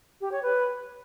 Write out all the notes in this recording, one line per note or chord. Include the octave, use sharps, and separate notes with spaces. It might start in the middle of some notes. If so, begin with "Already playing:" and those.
G4
C#5
B4